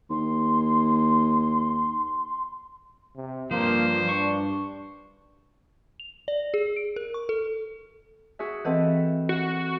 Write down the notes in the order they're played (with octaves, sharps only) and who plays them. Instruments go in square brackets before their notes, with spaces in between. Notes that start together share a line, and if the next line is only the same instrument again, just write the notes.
[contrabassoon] D#2 [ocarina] C6
[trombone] C3
[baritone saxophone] G2 [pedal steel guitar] F3 [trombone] A#3 [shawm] C5
[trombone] D4 [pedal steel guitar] C#6
[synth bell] F7
D5
G#4
D7
A#4
C#6
A4
[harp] F#4 G#4 E5
[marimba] E3 D#5 F#5 [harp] C4 A4 B4
[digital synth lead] F#4